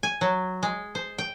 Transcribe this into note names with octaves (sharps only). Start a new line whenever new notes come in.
G#5
F#3
G#3
C5
G5